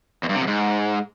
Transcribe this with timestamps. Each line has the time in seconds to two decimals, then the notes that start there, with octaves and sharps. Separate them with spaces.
0.23 E2
0.29 G2
0.35 C3
0.41 F2
0.47 G#2